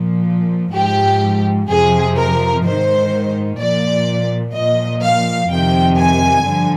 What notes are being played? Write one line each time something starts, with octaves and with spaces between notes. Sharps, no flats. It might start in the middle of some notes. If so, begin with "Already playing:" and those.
Already playing: A#2 F3
G#2 F3 G4
F2 C3 F3 G#4
A#4
G#2 D#3 C5
A#2 F3 D5
A#2 F3 D#5
F5
F2 C3 D#3 G5
G#5
G2 D3 F3